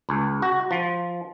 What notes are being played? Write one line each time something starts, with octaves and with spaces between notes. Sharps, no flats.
C#2
F#4
F3